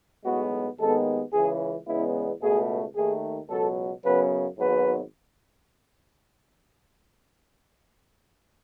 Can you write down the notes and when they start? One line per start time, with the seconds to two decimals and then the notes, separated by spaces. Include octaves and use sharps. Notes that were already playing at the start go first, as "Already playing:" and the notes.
0.24 B1 A2 G#3 B3 F#4
0.79 D#2 D#3 G#3 B3 A4
1.33 C#2 C#3 E3 G#4
1.87 E2 C#3 G#3 B3 E4
2.42 C#2 B2 A3 G#4
2.96 D#2 D#3 A3 G#4
3.50 C#2 B2 F#3 A4
4.04 F#2 C#3 F#3 B3 B4
4.59 G#1 G#2 F#3 B3 B4